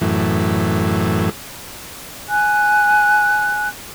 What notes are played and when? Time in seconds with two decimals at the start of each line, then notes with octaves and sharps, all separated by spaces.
0.01 F#2 A2 E3
2.29 G#5 F#6